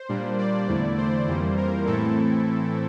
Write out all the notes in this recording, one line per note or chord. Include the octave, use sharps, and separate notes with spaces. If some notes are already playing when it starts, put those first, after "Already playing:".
Already playing: C5
A#2 G3 A#3 D4
D5
E2 D3 A3 E4
C5
F2 E3 G3 A#3
A#4
A2 E3 A3 C4 E4 A4